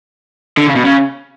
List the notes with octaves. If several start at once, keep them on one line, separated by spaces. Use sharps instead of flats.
D3
C#3
B2
C#3